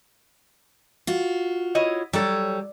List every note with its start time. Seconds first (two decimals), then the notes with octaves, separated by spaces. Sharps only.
1.07 F4 F#4
1.75 E4 C#5 D#5
2.13 F#3 G3 A4 C#5